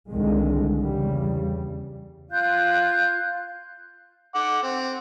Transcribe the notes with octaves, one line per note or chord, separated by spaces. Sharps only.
C2 D3 D#3 G#3
E2 C#3 G3
F4 F5 F#6 G6
F#5 D6
C4